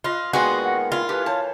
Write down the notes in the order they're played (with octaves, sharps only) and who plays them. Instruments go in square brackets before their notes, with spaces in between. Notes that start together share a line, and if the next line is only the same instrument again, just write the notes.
[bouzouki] F4 [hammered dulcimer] B4 D#5 C6
[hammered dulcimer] A#2 D#3 [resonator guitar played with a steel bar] G#3 B3 G#4 [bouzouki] F#4 [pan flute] C6
[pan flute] F#5
[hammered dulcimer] E4 [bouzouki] F4 [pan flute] F5
[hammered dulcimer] E3 A4 [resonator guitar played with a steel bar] G4 [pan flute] B4
[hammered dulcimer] C5 [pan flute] C#5 [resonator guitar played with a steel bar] A5